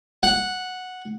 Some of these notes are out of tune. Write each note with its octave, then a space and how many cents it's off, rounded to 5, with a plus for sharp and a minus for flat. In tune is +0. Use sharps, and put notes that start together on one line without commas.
F#5 -5